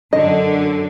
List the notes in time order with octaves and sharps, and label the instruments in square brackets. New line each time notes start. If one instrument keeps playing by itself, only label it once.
[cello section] F#2 D3 [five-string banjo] D#5